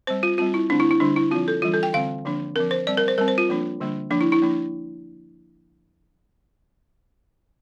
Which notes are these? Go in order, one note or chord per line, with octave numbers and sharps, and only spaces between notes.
G3 C4 C5
F4
G3 C4 F4
E4
D3 A3 C4 D4
E4
E4
D3 G3 D4
E4
F3 C4 F4
A4
E3 G3 D4 F4
A4
G5
D3 G3 C4 F5
D3 F3 A#3 D4
F3 C4 A#4
C5
G3 C4 D5
A#4
C5
G3 C4 A#4
C5
F4
F3 A#3 D4
D3 G3 A#3 D4
F3 A#3 D4
E4
E4
F3 A#3 D4